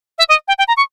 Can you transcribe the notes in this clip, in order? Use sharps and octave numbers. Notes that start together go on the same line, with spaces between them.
E5
D#5
G5
G5
A#5
C#6